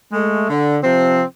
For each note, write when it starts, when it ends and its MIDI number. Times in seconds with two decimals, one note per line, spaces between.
0.12 0.48 56
0.12 0.48 57
0.50 0.77 50
0.83 1.23 48
0.83 1.23 53
0.83 1.23 60